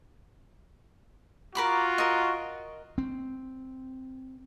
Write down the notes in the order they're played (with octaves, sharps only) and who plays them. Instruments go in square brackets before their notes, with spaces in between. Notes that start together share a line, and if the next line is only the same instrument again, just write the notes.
[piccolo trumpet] F4 [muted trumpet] F#4 [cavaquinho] A#4 B5 D6
[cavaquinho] A#4 D#5
[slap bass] C4